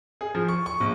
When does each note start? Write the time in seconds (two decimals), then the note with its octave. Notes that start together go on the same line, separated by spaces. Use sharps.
0.21 G#4
0.35 F3
0.48 C#6
0.66 C#6
0.80 A#1